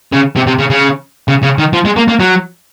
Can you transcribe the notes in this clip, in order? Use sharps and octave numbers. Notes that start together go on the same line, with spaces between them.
C#3
C3
C3
C#3
C#3
C#3
C#3
D#3
F3
G#3
A#3
A#3
F#3